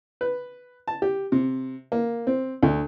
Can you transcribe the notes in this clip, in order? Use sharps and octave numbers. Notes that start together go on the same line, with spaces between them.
B4
A5
G4
C3
A#3
C4
D2